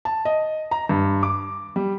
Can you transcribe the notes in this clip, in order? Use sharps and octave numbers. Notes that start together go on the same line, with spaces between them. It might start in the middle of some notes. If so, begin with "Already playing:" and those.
A5
D#5
A#5
G2
D6
G3